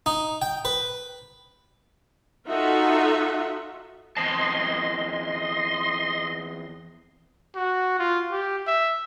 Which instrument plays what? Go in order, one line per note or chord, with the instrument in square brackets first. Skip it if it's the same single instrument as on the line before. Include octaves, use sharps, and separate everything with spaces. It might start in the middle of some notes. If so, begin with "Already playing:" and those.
[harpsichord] D#4
G5
B4
[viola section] D#4 F4 F#4 A4 E5 F#5
[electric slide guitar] E2 C4 A5 [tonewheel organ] D#5 C6
[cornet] F#4
F4
G4
E5